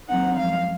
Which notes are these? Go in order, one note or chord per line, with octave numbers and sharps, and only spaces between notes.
D#2 D#3 F#3 C4 D#4 F#5
F#2 F3 G#3 F5